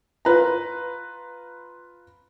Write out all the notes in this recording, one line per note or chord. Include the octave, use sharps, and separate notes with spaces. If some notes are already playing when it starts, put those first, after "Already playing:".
F4 B4 A#5